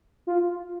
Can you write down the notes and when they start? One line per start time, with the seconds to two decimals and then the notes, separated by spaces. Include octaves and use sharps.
0.27 F4